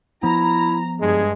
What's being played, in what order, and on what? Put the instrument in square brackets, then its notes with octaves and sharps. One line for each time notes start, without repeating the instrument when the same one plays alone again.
[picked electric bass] F3 B3 [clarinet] E4 [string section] A#5
[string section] G2 [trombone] G#3 [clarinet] G#4